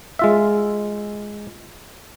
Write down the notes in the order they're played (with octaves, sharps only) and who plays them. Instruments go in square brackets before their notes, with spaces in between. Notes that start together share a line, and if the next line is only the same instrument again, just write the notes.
[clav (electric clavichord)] G#3 F4 E5